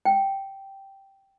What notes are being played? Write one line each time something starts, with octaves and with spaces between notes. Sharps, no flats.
G5